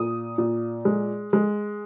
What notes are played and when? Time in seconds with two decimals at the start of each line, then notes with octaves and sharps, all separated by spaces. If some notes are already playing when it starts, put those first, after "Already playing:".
Already playing: A#2 D#6
0.38 A#2
0.85 G#3
1.33 G#3